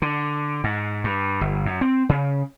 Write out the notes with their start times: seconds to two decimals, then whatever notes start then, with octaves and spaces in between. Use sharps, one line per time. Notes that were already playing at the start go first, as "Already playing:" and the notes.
0.02 D3
0.64 G#2
1.04 G2
1.41 G1
1.66 F#2
1.81 C4
2.09 C#3